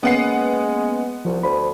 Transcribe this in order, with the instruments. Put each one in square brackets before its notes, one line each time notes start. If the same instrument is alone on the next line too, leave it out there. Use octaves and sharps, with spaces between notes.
[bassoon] G#3 [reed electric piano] A#3 C#4 [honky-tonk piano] B3 F#5 C7
[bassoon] C2 [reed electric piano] F3
[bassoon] D2 [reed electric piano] C5 B5